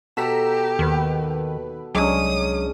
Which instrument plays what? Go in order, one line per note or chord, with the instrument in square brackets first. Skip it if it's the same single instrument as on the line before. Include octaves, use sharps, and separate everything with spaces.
[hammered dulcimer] B2 A4 [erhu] G4 [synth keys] A#5 B6 E7
[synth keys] D#2 B4 [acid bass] D#3
[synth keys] C2 [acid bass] F#3 [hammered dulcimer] G#3 C#4 D4 [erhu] D#6